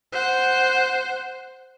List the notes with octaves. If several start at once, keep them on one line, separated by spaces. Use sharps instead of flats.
C5 F#5